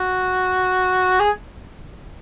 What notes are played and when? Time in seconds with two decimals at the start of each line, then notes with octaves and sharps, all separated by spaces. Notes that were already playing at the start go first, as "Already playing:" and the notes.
Already playing: F#4
1.20 G#4